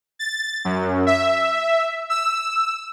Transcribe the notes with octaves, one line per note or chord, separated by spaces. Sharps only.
A6
F#2
E5
E6